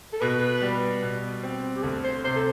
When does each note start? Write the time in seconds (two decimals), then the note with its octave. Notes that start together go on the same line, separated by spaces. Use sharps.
0.13 A4
0.21 B2 B4
0.62 G3
1.02 B2
1.43 C4
1.76 G4
1.83 D2 A4
2.04 C5
2.24 C3 C5
2.36 A4